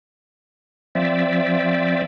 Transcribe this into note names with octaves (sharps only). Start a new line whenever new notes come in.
F3 C4 D5 E5